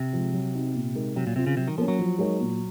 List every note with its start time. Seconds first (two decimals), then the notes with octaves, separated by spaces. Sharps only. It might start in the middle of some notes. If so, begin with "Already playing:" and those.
Already playing: C3
0.13 F3 G#3
0.33 F#3
0.54 C4 D#4 F#4
0.75 A#2
0.95 G#3 D#4 A#4
1.15 C3 F#3
1.27 A#2
1.36 C3 C4 F4
1.47 C#3
1.57 C3 F#3
1.68 D#3
1.78 F3 A#3 C#4
1.88 F#3
1.99 F3
2.19 G#3 D#4 A#4 C#5
2.40 A#2